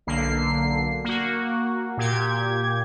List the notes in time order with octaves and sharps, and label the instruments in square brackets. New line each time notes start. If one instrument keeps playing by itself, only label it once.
[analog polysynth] B1 D3 A#3 C7
A#3 F#4
A#2 G4 G#6